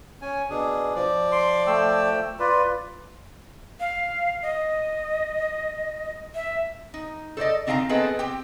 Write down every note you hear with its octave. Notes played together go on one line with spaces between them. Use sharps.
C#4 G#5
B2 D4 G#4
F3 D5
C6 D6
A3 G5 E6
F4 B4 D5
F5
D#5
E5
D#4
A4 C5 D5 D#5
D3 C4 D#4 F5 G5 A#5
B3 C4 G#4 A4 B4 D#5
C4 G4 G5